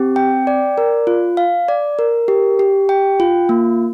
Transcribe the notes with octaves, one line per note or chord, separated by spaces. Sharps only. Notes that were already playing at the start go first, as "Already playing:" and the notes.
Already playing: C4 G4
G5
D5
A#4
F4
F5
D5
A#4
G4
G4
G5
F4
A#3